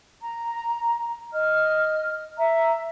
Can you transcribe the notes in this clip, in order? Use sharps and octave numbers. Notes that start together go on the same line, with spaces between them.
A#5
D#5 F6
E5 A#5